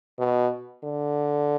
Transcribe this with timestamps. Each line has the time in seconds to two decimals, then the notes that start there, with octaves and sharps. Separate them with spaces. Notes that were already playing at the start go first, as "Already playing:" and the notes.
0.19 B2
0.84 D3